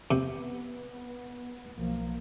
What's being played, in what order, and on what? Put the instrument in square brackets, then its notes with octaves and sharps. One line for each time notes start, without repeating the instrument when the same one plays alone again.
[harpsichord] C3 [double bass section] B3
[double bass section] B1 F3 A#3